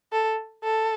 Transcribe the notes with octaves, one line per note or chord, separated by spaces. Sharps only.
A4
A4